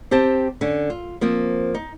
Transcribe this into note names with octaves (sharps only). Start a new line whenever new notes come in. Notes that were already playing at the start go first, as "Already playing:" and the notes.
C4 G4 C5 A5
D3 C#4
F4
F3 A#3 C4
D#4